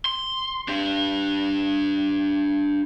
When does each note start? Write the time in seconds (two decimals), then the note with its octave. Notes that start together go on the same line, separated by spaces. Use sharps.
0.05 C6
0.68 D4 G4